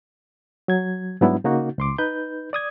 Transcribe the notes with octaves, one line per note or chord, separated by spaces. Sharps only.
F#3 G#6
G#2 F#3 G3 B3 D4 E4
C#3 A#3 D#4 F#4
C#2 C6 D6
D#4 B4 G6
D5 D#6 G#6